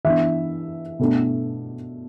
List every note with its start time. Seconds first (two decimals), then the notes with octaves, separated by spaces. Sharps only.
0.05 E3 B3 D4 E5
0.99 B2 A3 D4